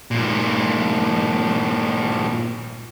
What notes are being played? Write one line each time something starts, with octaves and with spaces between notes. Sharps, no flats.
G2 A#2